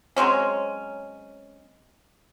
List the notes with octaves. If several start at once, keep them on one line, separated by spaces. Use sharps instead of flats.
F#3 G#3 C4 C#4